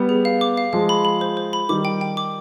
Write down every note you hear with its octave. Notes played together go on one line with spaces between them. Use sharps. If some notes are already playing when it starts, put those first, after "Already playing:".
Already playing: G3 B3
G#4
F5
D6
F5
F3 G#3 F5
B5
B5
C5
C5
B5
D#3 G3 D6
G5
G5
D6